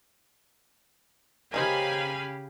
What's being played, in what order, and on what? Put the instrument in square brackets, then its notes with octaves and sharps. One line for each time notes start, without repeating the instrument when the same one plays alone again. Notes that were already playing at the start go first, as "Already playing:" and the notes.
[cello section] C#3 G4 [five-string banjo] A#3 D#4 C5 [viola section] F5 G#5 B5